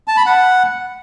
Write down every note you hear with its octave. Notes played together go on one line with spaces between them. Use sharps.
A5
B5
F#5